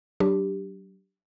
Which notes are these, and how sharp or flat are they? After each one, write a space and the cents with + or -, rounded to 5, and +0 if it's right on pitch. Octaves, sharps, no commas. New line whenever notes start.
F#3 +35 D4 +0 G4 +0